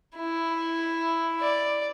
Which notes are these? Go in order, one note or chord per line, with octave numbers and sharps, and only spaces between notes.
E4
D5